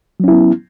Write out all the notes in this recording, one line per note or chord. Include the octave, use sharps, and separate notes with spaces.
F#3 B3 C#4 E4